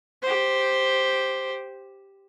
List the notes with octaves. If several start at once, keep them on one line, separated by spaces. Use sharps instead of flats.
G4 C5